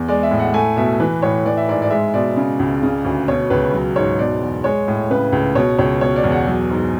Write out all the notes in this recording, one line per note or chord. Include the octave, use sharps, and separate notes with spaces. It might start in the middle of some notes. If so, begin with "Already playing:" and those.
Already playing: E2
G#3 D5
E5
A2
F#5
A3 G#5
B2 E5
E3 B4
A2 C#5
E3 D5
E5
G#2 D5
D5
G#3 E5
B2 D5
C#3
C#2
C#3
D2
B2 C#5
C#2 B4
F#3
G#2 C#5
B2 D5
E2
G#3 C#5
A2
C#3 B4
C#2
B2 C#5
C#2 C#5
B2 C#5
D5
E2
F#5
F#3
G#2